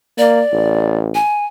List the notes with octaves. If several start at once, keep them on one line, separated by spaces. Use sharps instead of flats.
A#3 D5
A1
G#5